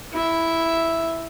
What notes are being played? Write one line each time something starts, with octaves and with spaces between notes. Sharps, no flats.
E4 E5